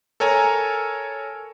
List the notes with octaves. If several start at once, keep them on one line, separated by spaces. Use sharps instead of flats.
A4 A#4 C#5 G#5 A#5